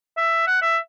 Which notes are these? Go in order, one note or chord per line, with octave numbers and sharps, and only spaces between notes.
E5
F#5
E5